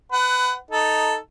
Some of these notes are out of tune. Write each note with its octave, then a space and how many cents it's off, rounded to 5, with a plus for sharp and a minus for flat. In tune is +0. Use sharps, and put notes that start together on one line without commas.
B4 +25 F#5 +15
D#4 +0 A4 +0